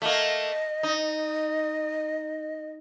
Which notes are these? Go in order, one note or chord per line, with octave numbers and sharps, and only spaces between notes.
A3 A#3 D#5
D#4